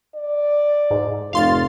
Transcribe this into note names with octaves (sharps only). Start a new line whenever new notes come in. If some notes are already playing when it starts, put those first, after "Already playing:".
D5
G#2
F1 F4 F5 C6 A6